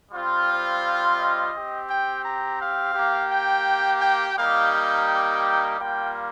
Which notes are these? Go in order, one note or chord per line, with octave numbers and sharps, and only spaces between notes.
G3 C4 F4
C5
D#5
C4 G4
G5
A#5
F5
A#3 G4
G5
G5
G3 A#3 D#4 G4 F5
F5
G5
G3 A#3 F4 G5